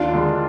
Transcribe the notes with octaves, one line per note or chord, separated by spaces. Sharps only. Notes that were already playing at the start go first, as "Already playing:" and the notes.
Already playing: D#2 D4 F4
D3 G#3